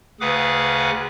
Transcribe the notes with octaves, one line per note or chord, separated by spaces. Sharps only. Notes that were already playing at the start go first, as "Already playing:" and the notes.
D2 C#3 G#4 B4 F#5 D6